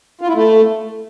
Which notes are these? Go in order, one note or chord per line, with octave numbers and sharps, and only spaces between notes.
F4
E4
A3